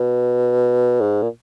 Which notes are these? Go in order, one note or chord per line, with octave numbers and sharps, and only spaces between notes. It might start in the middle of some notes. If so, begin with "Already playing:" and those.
Already playing: B2
G#2
A#2